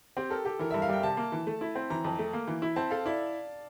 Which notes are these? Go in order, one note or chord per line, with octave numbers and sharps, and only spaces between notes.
C4 G4
A4 A#4
G4 A4
E3 A#4
G2 E5
F5
G3 G5
C3 A5
A#3
E3
A3
E4
C4
E3 A#5
F2
A3
A#3
E3
E4
C4 A5
A4 F5
E4 D5